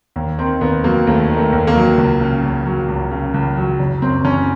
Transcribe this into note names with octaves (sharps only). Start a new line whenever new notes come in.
D#2
D#3 C4
D#2 B3
F#3 A#3
D#2 A3
D#3
A3
D#2
A#3
F#3
C#2
C#3
C#2
F#3
C#2
C#3
C#2
F#3
F#1
F#2 C4
F#1 C#4